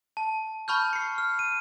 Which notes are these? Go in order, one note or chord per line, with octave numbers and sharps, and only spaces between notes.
A5
A5 B5 C#6 F6 G6
C7 C#7
F6
D#7